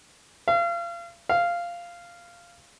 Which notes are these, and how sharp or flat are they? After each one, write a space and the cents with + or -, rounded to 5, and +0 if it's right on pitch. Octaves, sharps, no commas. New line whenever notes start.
F5 -35
F5 -10